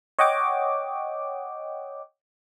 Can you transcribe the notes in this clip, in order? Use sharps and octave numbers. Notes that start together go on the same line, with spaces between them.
C#5 D#5 F#5 G5 D6